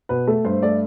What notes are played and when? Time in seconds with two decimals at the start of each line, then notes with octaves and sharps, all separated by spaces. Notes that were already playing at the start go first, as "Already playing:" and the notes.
0.09 B2 B4
0.27 A3 A4
0.44 G2 C5
0.62 A3 D5